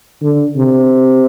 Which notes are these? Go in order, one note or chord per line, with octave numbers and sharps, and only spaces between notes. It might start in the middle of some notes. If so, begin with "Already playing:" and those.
D3
C3